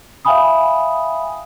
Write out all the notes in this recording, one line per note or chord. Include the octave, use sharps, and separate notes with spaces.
E5 F5 G5 G#5 B5 D#6